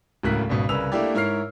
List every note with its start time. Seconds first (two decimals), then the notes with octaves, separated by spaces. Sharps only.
0.23 D1 C#2 A2 A#4 F#6 B6
0.49 G#1 C#2 B2
0.69 C2 C#3 A#4 B4 E6 F7
0.92 A3 A#3 D4 E4 G4 D5
1.14 G#2 E4 A#4 C#5 F6 C7